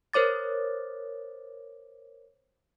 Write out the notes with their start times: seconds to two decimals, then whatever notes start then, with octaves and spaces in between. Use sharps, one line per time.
0.13 A#4 C5 C#5 D6 A6